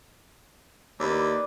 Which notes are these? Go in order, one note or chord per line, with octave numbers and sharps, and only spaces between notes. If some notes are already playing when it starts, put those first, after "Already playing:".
D#2 B4 D5